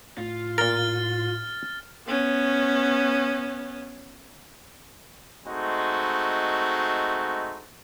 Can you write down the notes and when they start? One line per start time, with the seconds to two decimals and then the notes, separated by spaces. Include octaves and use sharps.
0.18 A2 F4
0.58 A#2 A#4 F6 A6
2.06 B3 C#4
5.46 G#3 A3 C4 D#4 F#4